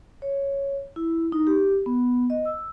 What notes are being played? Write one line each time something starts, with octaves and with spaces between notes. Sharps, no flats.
C#5
E4
D#4
G4
B3
D#5
E6